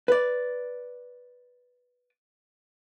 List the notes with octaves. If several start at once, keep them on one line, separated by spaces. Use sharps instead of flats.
B4 D5